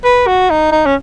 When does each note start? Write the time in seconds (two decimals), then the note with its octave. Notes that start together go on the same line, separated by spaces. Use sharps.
0.04 B4
0.27 F#4
0.50 D#4
0.72 D#4
0.86 C#4